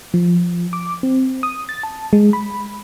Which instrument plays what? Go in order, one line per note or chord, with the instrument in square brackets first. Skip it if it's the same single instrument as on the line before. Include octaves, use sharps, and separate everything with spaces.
[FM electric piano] F3
D6
C4
D#6
A6
A5
G#3
B5